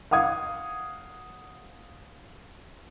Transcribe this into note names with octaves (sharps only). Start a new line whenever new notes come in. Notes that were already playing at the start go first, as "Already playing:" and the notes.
F5 F#5 D#6 G#6